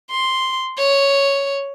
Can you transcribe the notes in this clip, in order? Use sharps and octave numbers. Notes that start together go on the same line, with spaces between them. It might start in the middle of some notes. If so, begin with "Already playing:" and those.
C6
C#5